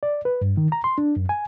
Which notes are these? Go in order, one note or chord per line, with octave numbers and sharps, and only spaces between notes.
D5
B4
G2
D#3
A#5
C6
D4
F#2
G#5